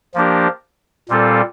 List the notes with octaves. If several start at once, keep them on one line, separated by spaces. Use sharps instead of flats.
F3 A#3 D4 G4 A#4
A#2 G3 C4 F4 A4